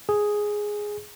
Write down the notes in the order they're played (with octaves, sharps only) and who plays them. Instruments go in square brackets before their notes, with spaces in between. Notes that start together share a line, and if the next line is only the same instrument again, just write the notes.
[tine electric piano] G#4